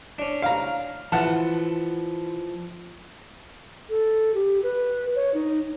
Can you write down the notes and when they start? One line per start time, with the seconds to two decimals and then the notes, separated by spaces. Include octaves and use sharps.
0.19 C#4 D4
0.42 F5 A#5
1.12 E3 F3 F#5 A5
3.89 A4
4.34 G4
4.63 B4
5.15 C#5
5.34 D#4